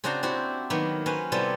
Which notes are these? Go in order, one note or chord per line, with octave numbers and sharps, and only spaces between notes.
C#3 C4 D4 F#4 C5 A#5
C4 E4 F#4 G4
D#3 F#3 A#3 B3
C#4 B4 C5 A#5
C3 G3 B3 E4 A4 C5